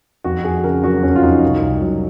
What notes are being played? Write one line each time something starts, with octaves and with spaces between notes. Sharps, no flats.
F2 F#4
F2 G#4
C#3 A#4
F#3 F#4
F2 C#4
F4
F2 D#4
C2
C2
F#3